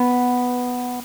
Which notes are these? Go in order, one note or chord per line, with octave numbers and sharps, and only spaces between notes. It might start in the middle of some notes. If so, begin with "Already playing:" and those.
Already playing: B3